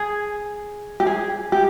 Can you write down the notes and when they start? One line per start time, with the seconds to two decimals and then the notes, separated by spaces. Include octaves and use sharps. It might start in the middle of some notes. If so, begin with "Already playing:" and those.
Already playing: G#4
1.00 G4
1.07 G#4
1.52 G4